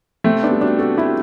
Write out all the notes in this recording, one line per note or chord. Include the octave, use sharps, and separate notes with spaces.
C3 A3 C4
B3 D4
G3
D4 F#4
C3 F#4 A4
E4 G4
G3